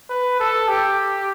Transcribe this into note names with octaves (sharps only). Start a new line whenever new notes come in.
B4
A4
G4